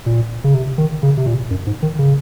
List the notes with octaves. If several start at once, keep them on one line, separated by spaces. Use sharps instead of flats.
A#2
C#3
C3
D#3
C#3
C3
A#2
F#2
G#2
D#3
C#3